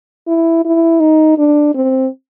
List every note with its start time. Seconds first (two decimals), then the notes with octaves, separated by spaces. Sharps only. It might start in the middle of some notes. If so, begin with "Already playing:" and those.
0.27 E4
0.64 E4
1.00 D#4
1.38 D4
1.75 C4